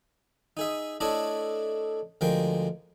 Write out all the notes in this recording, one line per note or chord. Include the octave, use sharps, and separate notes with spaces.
D#4 G#4 E5
A3 D4 E4 A4 C#5 D#5
D2 F3 G#3 A#4 G5